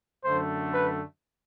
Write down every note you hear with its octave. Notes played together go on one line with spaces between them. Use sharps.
F#2 D3 A3 C5
B4